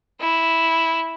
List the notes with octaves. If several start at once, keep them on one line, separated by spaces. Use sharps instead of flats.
E4